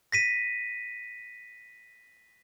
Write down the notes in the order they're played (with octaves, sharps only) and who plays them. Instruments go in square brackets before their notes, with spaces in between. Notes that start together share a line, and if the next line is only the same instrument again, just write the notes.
[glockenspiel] A#6 B6 D#7